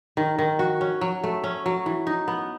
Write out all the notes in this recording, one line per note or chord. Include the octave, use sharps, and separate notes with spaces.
D#3
D#3
F#4
C#4
F#3
A3
C#4
F#3
E3
D#4
B3